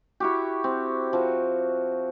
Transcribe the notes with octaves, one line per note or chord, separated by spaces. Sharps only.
E4 F#4 G4
C4
F3 F#4